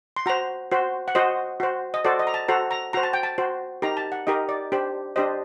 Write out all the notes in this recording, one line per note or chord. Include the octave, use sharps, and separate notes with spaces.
C6
F#4 C5 A#5
F#4 C5
F#5
F#4 C5 D#5
F#4 C5
D#5
F#4 A4 C5 D5
D#5
A#5
A5
F#4 A4 C5 A#5
A#5
F#4 C5 A#5
A5
G5
A5
F#4 C5
D#4 G4 A#4 A#5
A5
F#5
D#4 G4 A#4 D#5
D5
D4 G4 C5
D4 G4 C5 D#5